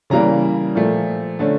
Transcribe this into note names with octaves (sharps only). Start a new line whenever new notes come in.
C#3 E3 G3 A#3 A#5
A#2 F3 A3
D3 A3 C#4